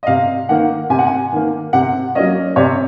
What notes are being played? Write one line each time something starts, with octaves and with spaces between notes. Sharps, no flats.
D#5
C3 F5
D#3 A#3 F#5
C3 G#5
F#5
G#5
D#3 A#3
C3 F#5
F#3 A#3 C#4 D#5
C3 C#5